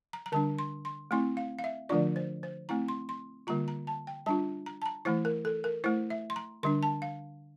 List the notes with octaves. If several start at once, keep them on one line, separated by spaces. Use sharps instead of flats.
A#5
A#5
D3 G3 D4 A5
C6
C6
A3 C4 E4 C6
F5
F5
E5
D3 F3 A3 D4 F4 D5
C5
C5
A3 C4 E4 A#5
C6
C6
D3 G3 A#3 F4 A#5
A#5
A5
G5
G3 D4 F4 A5
A#5
A5
A#5
E3 A3 E4 C5
A#4
A4
A#4
A3 E4 C5
E5
C6
A#5
D3 G3 D4 C6
A5
F5